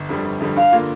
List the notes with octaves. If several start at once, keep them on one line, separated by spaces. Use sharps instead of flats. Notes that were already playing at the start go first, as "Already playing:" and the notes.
Already playing: G1
F2 D3 G3
G1
F2 D3 G3
G2 F5
D3 A#3 F4